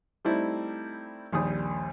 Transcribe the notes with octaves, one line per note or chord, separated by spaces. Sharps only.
G3 A3 C4 D#4 E4
A#1 D#2 G3 D#6